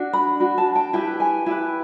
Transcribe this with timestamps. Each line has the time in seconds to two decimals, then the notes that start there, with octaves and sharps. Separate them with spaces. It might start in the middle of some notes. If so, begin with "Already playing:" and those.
Already playing: D4 F#4
0.13 B5
0.40 D4 F#4
0.58 A5
0.75 G5
0.93 E4 G4 B4 G5
1.20 G#5
1.46 E4 G4 B4